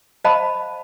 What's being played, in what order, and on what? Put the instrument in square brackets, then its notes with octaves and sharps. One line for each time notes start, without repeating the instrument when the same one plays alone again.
[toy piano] C5 D#5 F5 A5 B5